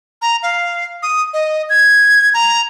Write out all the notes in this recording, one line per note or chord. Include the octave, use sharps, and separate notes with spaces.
A#5
F5
D#6
D#5
G#6
A#5